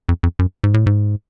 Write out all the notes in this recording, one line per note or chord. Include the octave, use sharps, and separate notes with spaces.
F2
F2
F#2
G#2
A2
G#2